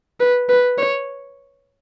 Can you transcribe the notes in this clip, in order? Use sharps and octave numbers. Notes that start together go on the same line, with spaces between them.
B4
B4
C#5